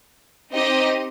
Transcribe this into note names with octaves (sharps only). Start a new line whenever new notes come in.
C4 D#4 G4 C5 D#5